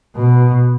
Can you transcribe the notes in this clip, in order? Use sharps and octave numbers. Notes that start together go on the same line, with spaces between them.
B2